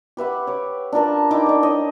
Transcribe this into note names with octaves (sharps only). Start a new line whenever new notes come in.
G4 B4 E5 F#5
C#5 D6
D4 F4 A#4 A5
D#4 E4 G5 D6
D4 D#5
C#5 D#5